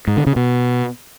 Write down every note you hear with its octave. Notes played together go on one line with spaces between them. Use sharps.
G#2
D3
C#3
B2